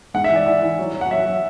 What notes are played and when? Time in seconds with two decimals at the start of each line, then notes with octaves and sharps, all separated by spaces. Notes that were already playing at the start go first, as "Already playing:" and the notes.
0.14 G#2 F#5
0.24 E5
0.30 E3
0.36 D5
0.46 E3
0.62 E3
0.79 F#3
0.94 F#3
1.01 F#5
1.11 F#3 E5
1.26 F#3